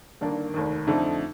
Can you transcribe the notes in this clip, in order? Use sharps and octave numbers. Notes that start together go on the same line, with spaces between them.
G1 G2 D#3 A#3 D4
F1 D#2 D#3
F2 D3 F3 A3 D#4